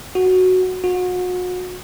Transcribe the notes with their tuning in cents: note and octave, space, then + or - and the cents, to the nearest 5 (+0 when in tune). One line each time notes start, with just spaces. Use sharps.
F#4 +0
F#4 -35